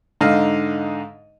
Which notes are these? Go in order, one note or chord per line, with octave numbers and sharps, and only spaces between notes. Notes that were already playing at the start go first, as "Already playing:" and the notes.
G#2 D3 D#4 D#5 F5 F6